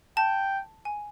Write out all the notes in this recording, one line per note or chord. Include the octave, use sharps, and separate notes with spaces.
G5 A5
G#5